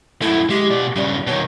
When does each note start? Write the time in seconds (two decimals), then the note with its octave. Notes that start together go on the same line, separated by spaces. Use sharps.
0.22 F#2 A3 E4
0.50 G#3 G4
0.70 B2 D5
0.96 G2 C#3 G3
1.27 B2 D#3 C#5